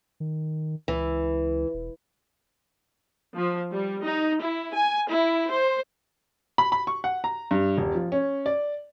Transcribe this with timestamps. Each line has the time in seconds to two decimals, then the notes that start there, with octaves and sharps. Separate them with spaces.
0.20 D#3
0.88 C#2 E3
1.74 E1
3.35 F3
3.71 G3
4.03 D#4
4.39 E4
4.74 G#5
5.08 E4
5.51 C5
6.58 B5
6.72 B5
6.87 C#6
7.04 F#5
7.24 A#5
7.51 G2
7.77 D#1
7.95 F3
8.12 C#4
8.46 D5